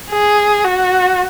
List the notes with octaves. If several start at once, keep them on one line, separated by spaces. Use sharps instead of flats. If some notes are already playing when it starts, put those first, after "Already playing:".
G#4
F#4